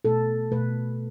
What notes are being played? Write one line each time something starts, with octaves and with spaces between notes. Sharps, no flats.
B2 A3 A4
B2 A3 B4